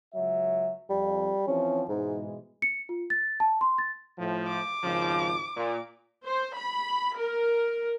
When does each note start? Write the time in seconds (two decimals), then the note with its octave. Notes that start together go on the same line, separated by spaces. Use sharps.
0.14 C#2 F#3 E5
0.90 F2 G3
1.47 E3 F3 C4 C#4
1.89 G#2 B2 E3 G#3
2.62 C#7
2.89 F4
3.10 A6
3.40 A5
3.61 C6
3.78 A6
4.19 A2 F3
4.48 D6
4.83 G#1 C#3 F3
5.56 A#2
6.25 C5
6.56 B5
7.18 A#4